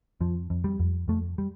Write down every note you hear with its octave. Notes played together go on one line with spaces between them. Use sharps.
F2 F3
F2
G3
F2
F2 A3
G3